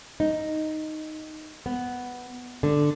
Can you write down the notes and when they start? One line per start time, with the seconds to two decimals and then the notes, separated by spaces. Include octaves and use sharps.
0.20 D#4
1.66 B3
2.63 D3